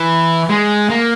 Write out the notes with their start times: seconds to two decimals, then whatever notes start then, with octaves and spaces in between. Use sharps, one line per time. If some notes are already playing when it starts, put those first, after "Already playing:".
Already playing: E3
0.50 G#3
0.90 A#3